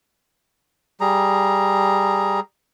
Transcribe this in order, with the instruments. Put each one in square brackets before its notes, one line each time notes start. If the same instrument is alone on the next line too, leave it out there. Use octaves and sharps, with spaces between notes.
[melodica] G3 G#4 A#5